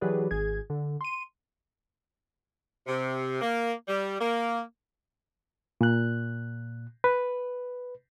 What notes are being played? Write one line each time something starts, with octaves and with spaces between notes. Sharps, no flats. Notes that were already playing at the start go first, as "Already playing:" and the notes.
E3 F#3 G4 G#4 B4 D5
G#1 G#4 G#6
D3
C6 D#7
C3
A#3
G3
A#3
A#2 F#6
B4